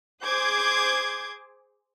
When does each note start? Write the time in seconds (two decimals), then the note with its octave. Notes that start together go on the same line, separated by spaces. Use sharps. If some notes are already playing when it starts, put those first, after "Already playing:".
0.24 G#4 C5 D6 G6 G#6